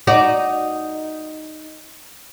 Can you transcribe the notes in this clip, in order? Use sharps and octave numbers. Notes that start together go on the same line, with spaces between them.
D#4 F#4 D5